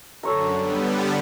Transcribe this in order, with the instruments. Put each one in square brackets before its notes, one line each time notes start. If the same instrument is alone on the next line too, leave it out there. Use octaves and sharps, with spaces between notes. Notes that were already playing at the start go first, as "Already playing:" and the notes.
[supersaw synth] F#2 D3 [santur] A4 C#5 A#5
[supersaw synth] D3 G3 B3